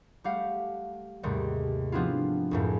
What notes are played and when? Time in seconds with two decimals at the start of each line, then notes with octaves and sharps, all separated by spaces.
0.24 G3 A3 G4 F5 F#5
1.23 D#2 G#2 C3 G3 A3
1.92 F3 B3 C4 D4 E4 F4
2.51 C#2 F#2 A2